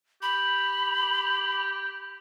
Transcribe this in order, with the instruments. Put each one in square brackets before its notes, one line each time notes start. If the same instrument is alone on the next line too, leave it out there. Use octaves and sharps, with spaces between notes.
[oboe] G4 [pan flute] B5